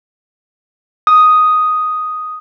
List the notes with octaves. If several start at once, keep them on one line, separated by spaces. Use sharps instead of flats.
D#6